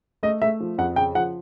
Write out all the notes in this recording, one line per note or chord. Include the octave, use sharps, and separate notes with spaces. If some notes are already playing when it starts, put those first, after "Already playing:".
A3 D#5
A3 E5
F3
F2 F#5
C#3 G5
F3 F#5